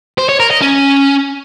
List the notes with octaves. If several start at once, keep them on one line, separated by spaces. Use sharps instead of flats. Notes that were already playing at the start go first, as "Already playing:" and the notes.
C5
C#5
A#4
D#5
C#4